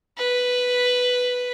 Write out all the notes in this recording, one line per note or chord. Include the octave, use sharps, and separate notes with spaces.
B4